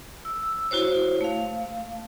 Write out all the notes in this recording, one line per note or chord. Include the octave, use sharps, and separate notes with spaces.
E6
E4 F#4 C5 C#5
A3 F5